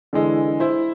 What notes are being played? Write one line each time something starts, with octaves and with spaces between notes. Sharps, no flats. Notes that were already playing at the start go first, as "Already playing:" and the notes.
D3 E3 G#3
E4 C5